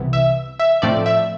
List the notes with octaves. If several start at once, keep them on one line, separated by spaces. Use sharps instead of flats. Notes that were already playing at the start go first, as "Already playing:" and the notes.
Already playing: C2 C3 E3 B3
E5
E5
A2 F3 A3 C4 D5
E5